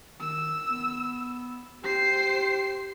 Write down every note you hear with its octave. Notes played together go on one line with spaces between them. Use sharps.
D#3 E6
B3
G4 C5 C7